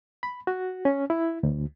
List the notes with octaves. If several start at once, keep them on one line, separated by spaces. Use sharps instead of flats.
B5
F#4
C#4
E4
D2